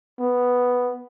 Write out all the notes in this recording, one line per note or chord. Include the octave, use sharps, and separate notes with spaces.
B3